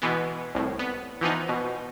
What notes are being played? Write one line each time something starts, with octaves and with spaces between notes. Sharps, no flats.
B2 E3 G#3 B3
C2 A2
B3
E3 F3 B3 D#4
B2